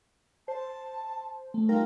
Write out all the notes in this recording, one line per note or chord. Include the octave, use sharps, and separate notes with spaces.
C5 A5
A3
G3 D#4 F4 A#4